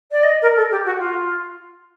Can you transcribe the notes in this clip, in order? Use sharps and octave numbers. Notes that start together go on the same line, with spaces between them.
D5
D#5
A#4
A4
G4
F#4
F4